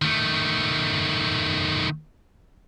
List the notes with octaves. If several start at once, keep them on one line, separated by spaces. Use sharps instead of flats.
D#3 A3